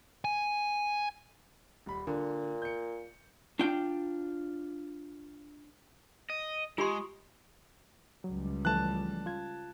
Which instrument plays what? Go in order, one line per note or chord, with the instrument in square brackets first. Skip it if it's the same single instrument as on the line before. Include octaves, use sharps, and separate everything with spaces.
[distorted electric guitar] G#5
[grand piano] D#1 B5
[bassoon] A#2 [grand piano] D3
[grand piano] G6 C#7
[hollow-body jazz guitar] D4 F4 G5
[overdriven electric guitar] D#5
[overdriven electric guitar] G#3 [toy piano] F4 G4 C6
[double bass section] C#2 G3 [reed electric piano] F#3
[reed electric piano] E3 F3 A3 [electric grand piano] A5 F#6
[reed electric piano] F4 G#6